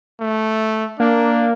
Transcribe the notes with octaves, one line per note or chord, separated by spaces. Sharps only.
A3
A#3 D4